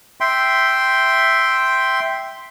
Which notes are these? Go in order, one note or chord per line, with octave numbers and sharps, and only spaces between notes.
E5 G5 C6